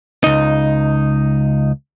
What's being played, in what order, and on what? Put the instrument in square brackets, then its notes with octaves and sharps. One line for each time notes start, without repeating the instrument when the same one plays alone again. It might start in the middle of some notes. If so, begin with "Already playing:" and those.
[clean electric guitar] C#2 D#4